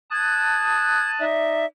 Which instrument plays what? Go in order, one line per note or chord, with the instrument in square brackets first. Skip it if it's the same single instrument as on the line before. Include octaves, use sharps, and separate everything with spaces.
[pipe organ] A5 D#6 F#6 [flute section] G#6
[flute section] D#4 D5 E5